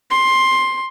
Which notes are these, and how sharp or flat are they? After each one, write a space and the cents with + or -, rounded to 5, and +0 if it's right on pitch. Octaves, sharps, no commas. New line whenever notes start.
C6 +15